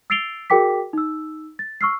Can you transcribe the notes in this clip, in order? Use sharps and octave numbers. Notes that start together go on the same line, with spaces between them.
E6 A6 C7 D7 F7 G7
F#4 G#4 A#4 G5 D6 B6
D#4 E6
A6
C#6 E6 F6 C7